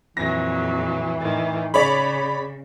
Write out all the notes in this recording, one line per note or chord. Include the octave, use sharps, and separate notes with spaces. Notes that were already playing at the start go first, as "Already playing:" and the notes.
F2 A#2 E3 F#3 A#6
A2 D#3
C#3 G#4 C#5 D5 B5